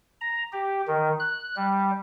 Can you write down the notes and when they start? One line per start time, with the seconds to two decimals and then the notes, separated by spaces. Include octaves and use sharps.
0.21 A#5
0.52 G4
0.88 D#3
1.19 F#6
1.56 G3